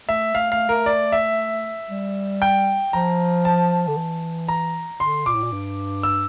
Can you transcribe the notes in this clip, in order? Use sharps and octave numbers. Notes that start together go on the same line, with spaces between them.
A3 E5
A3 F5
A3 F5
A3 A#4
D5
E5
G3
G5
F3 A#5
A5
D3
E3
A#5
D3 C6
A#2 D6
A2
A#2
G2
E6